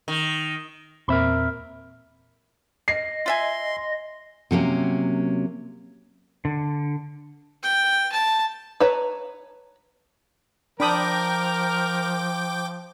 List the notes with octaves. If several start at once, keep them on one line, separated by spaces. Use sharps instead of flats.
D#3
E2 A#2 C4 A#4 E5 B5
D#5 C7
F4 E5 G#5 C6
C3 F#3 A#3 C#4
D3
G5
A5
B4 C#5 A5 A#5
F3 D4 A#4 G5 B5 D6 D#6 G6